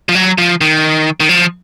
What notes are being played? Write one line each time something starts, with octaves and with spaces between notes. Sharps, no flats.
F3
F#3
F3
D#3
D#3
F3